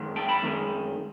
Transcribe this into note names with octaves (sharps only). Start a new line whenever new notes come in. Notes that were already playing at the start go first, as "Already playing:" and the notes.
Already playing: F#2 D#3 G#3
G5 A5
A5 B5
F#2 D#3 G#3